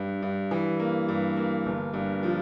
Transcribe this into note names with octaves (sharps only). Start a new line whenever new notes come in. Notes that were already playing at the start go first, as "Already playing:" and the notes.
Already playing: G2
G2
E3
A#3
G2
A#3
G1
G2
F3